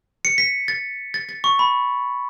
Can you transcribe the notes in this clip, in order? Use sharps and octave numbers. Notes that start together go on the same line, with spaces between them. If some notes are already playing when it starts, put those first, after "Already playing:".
C#7
B6
A6
A6
A6
C#6
B5